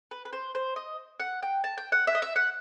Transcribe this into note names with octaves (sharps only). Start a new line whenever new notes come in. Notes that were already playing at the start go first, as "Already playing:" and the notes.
B4
B4
C5
C5
D#5
F#5
G5
A5
G5
F#5
E5
D#5
E5
F#5